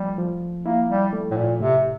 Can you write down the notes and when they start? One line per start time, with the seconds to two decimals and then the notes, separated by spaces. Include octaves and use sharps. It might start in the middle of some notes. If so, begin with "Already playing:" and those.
Already playing: F3 G3 A3
0.18 F3
0.65 A#3 E4
0.89 G3
1.13 A3
1.31 A2
1.37 A#2
1.60 A2 C3